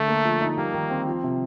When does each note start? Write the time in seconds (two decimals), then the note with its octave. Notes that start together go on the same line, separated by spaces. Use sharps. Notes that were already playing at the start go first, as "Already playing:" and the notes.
Already playing: D3 A3
0.08 A#3
0.25 F3
0.41 D#4
0.57 G3 A#3
0.74 D#3
0.90 C4
1.07 F3
1.24 C3